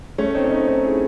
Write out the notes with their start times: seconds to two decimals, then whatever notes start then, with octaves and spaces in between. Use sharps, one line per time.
0.18 A3 C#4
0.35 C4 D#4
0.44 C#4
0.52 C4 D#4
0.68 C4 D#4
0.84 E4 G#4